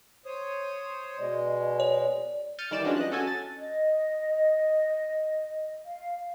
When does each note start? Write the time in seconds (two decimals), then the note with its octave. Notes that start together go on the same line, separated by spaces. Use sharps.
0.25 C5 C#5 D#6
1.18 B2 G#3 D5
1.80 C#5
2.59 F6 G6 A6 C#7 D#7
2.71 D#3 E3 G3 D5 E7
2.84 E3 F3 G#3 C#4 D4 F#4
2.97 D#5 F#6
3.11 C#4 F#4 A4 G#5
3.27 A6
3.58 D#5
5.84 F5